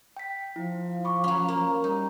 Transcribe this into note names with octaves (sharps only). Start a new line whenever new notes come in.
G5 B6
F3 E4
B5 C#6 D6
F#3 C#4
A#3
G3 D#4